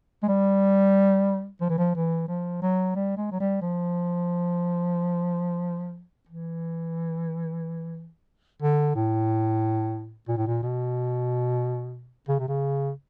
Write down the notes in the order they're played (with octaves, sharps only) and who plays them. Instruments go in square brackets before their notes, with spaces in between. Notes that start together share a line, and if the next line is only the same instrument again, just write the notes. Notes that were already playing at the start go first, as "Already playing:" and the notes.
[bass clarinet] G#3
G3
F3
E3
F3
E3
F3
F#3
G3
G#3
F#3
G3
F3
E3
D3
A2
A#2
A2
A#2
B2
C#3
C3
C#3